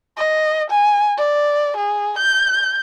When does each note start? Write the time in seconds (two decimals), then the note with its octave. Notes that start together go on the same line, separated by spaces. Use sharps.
0.17 D#5
0.70 G#5
1.18 D5
1.77 G#4
2.18 G6